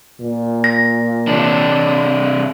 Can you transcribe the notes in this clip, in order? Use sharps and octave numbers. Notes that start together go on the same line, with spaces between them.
A#2
A#6
C3 D4